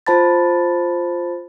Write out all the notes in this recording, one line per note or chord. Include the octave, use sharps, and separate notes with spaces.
F4 C5 A5 B5 A6